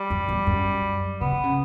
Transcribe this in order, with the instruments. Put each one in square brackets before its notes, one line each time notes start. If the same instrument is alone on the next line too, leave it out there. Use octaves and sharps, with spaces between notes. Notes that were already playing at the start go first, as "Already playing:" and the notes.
Already playing: [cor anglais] G3
[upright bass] F#2
E2
F#2
[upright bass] C#3 [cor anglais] B3
[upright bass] D3
C#3